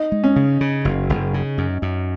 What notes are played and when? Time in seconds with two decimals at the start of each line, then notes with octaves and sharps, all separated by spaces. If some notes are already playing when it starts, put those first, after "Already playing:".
Already playing: D#4
0.12 G#3
0.24 C#4
0.36 C#3
0.61 C#3
0.85 F#1
1.09 F#1
1.34 C#3
1.58 F#2
1.82 F#2